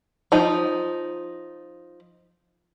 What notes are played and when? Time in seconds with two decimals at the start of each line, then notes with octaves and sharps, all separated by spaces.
0.32 F3 D#4